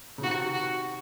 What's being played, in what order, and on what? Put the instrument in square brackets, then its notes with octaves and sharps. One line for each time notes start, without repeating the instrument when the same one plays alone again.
[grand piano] C#3
[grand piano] C3 D#3 [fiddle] F#4
[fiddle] F#4